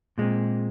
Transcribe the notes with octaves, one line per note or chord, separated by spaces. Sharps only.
A#2 G#3 C4